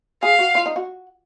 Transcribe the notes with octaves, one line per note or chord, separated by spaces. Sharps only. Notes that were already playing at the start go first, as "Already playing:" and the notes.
G#4 F5
F#4
F4
D#4
F#4